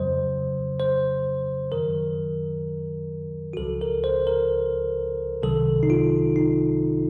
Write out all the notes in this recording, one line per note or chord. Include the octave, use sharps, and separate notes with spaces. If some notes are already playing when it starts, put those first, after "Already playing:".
Already playing: F2 C#3 F#3 C5
C5
F#2 D#3 F#3 A#4
F#4
C#2 C#3 F3 A4
A#4
C5
A#4
C2 C3 D#3 F#3 A4
D#4
F4
D#4